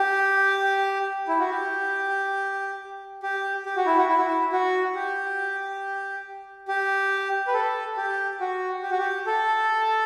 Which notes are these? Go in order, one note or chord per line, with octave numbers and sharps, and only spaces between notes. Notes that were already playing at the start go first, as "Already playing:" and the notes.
Already playing: G4
E4
F#4
G4
G4
G4
F#4
E4
F#4
E4
F#4
E4
F#4
G4
G4
B4
A4
G4
F#4
G4
F#4
G4
A4